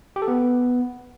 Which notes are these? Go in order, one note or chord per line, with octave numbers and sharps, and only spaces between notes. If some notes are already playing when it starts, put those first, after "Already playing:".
G4
A4
B3